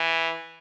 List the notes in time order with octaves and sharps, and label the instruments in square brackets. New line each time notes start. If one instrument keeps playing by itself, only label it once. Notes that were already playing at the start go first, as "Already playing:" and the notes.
Already playing: [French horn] E3